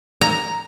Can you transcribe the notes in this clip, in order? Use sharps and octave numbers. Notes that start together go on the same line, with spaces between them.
A#5